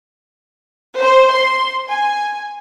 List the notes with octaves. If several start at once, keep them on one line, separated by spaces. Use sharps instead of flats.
C5
C6
G#5